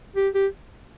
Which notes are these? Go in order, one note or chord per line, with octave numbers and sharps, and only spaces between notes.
G4
G4